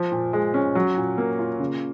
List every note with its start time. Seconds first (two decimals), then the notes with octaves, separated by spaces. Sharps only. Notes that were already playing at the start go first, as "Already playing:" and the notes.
Already playing: F3
0.12 A#2
0.33 G#3
0.54 C#4
0.75 F#3
0.96 A#2
1.18 A#3
1.39 F4
1.60 C#3